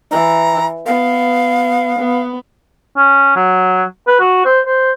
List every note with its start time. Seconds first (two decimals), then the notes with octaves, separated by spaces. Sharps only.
0.11 E3 A#5
0.86 B3 F5
1.99 B3
2.96 C#4
3.36 F#3
4.07 B4
4.20 F#4
4.45 C5
4.66 C5